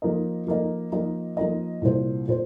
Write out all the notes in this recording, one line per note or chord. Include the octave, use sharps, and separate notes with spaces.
F3 A#3 D#4 A#4 D#5
F3 A#3 D#4 A#4 D#5
F3 A#3 D#4 A#4 D#5
F3 A#3 D#4 A#4 D#5
C2 A#2 A#3 F4 C5
A#2 A#3 F4 C5